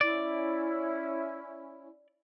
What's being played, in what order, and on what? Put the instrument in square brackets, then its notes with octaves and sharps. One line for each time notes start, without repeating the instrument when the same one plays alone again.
[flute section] C#4 E4 [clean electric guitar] D5